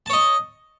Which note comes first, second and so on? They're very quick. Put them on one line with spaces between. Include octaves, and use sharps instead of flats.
A5 C#5 D#5